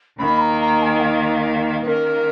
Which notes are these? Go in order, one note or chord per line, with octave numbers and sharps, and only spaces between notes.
D#2 D#3 A#3 B5
A#5
A#5
G#5
F5
B4
D#3 A#3 C#4 A#4